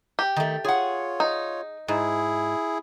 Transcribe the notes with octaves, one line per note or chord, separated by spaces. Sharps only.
G4
D#3 A3
F4 G#4 C#5 F#5
D#4
G#2 E4 G#4